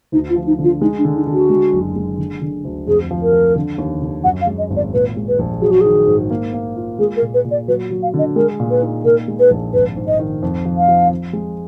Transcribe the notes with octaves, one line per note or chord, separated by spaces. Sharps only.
D2 D#4
F4
F3
D#4
D3
F4
G#3 D#4
D4
D3
D#4
D3
F#4
G#3
F#1
G#3
D3
D3
D2
F2 G#4
F3
A#4
F3
D3
D#2
D3
F#2 F#5
F5
G#3
D#5
G#1
D5
A#2 B4
G#3
B4
A#1
F#3 G#4
F#4
D#3 G#4
G#2
A#3
A#3
F4
G#3 G#4
A#4
A#2
B4
A#2
D5
F#3 B4
F#3
F5
D3 D#5
G#3 A#4
A#2
B4
D#4
A#2 A#4
G#3
B4
A#1
G#1 B4
G#2
D#5
D#3
F2
F3
F5
F3
F3
G#3